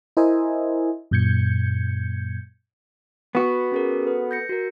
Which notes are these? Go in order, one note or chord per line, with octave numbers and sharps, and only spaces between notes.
E4 A#4 C5 D#5 E5 G#5
F#2 A#2 G6 G#6 C#7
B3 F#4 B5
C#4 G#4 A#4
A4 B4
G6 A#6 C#7
F#4 A#4